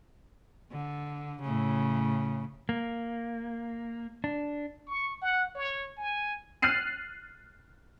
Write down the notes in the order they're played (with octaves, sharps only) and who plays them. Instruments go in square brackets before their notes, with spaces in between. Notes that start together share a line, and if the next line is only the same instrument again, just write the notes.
[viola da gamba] D3
A2 C#3
[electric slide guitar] A#3
D4
[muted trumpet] C#6
F#5
C#5
G#5
[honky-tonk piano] F6 F#6 A6 C7 D#7